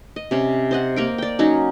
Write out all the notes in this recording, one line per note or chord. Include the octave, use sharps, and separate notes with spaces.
D#5
C3 C#4
C5 D#5 F#5
A#3 A#4 G5
D5 G5
F#3 C#4 D#4